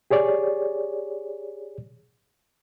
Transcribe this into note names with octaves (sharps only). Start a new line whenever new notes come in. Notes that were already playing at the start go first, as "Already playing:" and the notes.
G4 G#4 C#5 D5